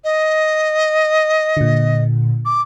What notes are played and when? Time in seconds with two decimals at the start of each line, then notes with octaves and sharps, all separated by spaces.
0.04 D#5
1.57 A#2 D3
2.45 D6